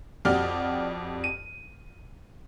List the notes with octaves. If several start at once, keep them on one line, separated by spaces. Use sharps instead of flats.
F2 F#4 G4 D5 F6
D#7